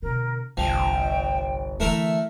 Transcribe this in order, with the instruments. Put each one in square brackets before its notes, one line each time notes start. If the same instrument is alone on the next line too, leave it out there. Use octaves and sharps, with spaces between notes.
[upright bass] B2 D3 [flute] A#4
[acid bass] G1 [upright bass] C2 [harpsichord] F3 [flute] G5
[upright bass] D3 E3 [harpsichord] A3 E4 A#4